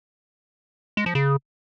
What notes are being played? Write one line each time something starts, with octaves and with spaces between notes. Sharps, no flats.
G#3
F3
C#3